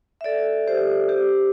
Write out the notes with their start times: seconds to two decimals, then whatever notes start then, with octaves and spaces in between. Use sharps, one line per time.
0.21 E5
0.24 A4 D5
0.67 G4 C5
1.09 G4 C5